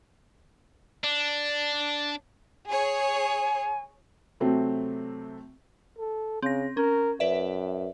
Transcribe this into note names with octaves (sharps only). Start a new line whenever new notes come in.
D4
G#4 C#5 G#5
C3 F#3 A3 C4
A4
C#3 C4 A#6
C#4 A#4
F#2 B4 D5 E5